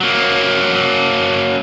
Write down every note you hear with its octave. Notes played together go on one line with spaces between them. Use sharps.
F#3 A#3